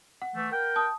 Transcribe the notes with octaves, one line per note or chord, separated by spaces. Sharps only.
F#5
E3 A3
A#4 G5
A5 D#6